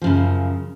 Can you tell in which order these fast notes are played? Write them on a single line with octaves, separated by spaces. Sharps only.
F3 F#2 C#3